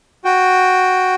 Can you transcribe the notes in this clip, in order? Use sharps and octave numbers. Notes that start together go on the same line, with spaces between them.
F#4 G5